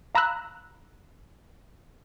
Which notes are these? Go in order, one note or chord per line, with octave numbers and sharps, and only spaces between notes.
F5 A#5 B5 E6 F#6